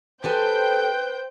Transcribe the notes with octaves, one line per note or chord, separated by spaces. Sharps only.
G4 A4 B4 C5 G5 G#5 G6